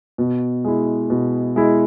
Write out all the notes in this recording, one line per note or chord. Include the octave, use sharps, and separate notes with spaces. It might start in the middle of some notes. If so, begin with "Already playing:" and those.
B2
G#3 E4
B2
G#3 E4